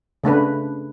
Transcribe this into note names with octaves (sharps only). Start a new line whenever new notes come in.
C#3 A3 D4 B4